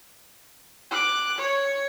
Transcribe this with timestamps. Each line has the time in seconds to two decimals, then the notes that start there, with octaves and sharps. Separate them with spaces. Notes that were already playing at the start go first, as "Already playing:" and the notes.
0.91 D6 F#6
1.38 C#5